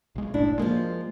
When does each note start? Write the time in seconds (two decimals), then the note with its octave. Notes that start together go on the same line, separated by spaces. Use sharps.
0.15 B1 G#3
0.34 F#1 A2 D4 E4
0.59 F3 G#3 A#3